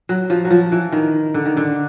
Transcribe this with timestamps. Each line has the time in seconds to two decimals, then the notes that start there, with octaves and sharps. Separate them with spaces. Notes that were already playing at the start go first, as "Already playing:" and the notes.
0.09 F#3
0.30 F3
0.45 F#3
0.51 F3
0.72 E3
0.92 D#3
1.34 D3
1.45 D#3
1.57 D3